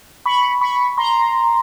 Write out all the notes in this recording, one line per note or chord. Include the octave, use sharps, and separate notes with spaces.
B5 C#6
B5 C#6
A#5 C6